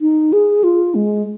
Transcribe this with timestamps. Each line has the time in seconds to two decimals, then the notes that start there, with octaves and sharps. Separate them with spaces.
0.01 D#4
0.33 G#4
0.64 F4
0.95 G#3